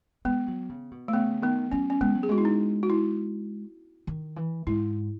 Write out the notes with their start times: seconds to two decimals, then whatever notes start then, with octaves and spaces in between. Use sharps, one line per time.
0.25 G#3 B3
0.48 F#3
0.69 C#3
0.91 B2
1.08 A3
1.13 C#3 B3
1.42 D#3 B3
1.71 F#3 C#4
1.90 C#4
2.01 G#3 B3
2.15 F#3
2.23 G#4
2.29 G#3 F#4
2.38 E4
2.45 D#4
2.83 F#4
2.90 E4
4.07 D#3
4.36 E3
4.67 G#2 E4